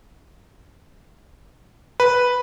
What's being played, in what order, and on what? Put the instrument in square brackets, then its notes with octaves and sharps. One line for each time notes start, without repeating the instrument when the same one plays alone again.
[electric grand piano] B4